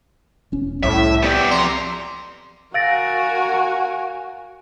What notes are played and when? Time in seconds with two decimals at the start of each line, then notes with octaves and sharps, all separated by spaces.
0.52 E1 C#4
0.83 C2 A2 E5
1.23 B3 G4 D5
1.51 F2 A#5 C6
2.74 F#4 A#4 F5 G#5 E6 A6 A#6 D7